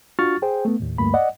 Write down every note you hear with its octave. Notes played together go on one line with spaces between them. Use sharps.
D4 F4 F#4 C#6 F6 A6
G#4 C5 G5
A3 B3
D#2 A2
D2 G2 A3 A#3 B5
D5 D#5 F#5